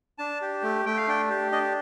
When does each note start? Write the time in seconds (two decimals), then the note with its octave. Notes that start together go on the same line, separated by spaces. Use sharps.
0.18 D4 A5
0.41 G4
0.63 A3
0.85 A3 G5
0.97 F5
1.08 D4 G5
1.29 G4
1.52 D4 D#5